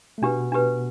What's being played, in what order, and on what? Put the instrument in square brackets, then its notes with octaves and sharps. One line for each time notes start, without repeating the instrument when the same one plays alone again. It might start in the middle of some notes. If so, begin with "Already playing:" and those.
[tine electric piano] A3
[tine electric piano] B2 B3 [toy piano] D4 G4 B4
[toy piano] D4 G4 B4